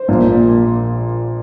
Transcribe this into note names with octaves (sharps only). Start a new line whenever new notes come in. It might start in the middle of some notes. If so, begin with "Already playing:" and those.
Already playing: C5
A#1 A#2 A#3 D4